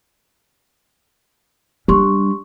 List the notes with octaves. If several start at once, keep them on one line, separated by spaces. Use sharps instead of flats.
G3 D4 G4 C6 C#6